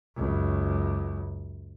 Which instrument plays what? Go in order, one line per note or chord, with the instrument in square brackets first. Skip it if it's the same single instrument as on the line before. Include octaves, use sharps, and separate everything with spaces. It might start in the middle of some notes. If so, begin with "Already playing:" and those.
[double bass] C#2 F#2